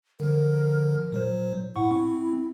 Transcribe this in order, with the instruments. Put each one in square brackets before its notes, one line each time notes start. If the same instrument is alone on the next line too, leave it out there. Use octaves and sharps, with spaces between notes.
[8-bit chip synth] D3 F3 [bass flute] A#4
[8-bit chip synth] A#2 F#3 C5
[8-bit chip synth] A2 F#5 C#6 [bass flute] E4
[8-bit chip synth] C4